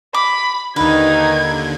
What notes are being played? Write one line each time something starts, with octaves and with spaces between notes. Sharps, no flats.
B5 D6
D#2 D3 D#3 A#3 D#4 B4 G#6